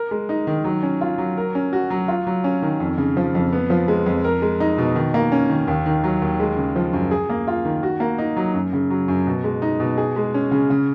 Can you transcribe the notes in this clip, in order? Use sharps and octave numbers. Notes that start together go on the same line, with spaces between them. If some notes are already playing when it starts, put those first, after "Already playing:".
Already playing: A#4
G#3
D#4
D#3
F#3
C#4
F4
F#3
A#4
C#4
F#4
F#3
F4
F#3
C#4
D#3
F2
C#3
F3
F2
B3
F3
G#3
F2
A#4
G#3
D#4
B2
D#3
A#3
C#4
D#3
D#2
D#3
F#3
D#2
G#3
C#3
F3
F#2
G#4
A#3
F4
D#3
F#4
A#3
D#4
F#3
F#2
C#3
F#3
F#2
B2
G#3
D#4
B2
G#4
G#3
C#4
C#3
C#3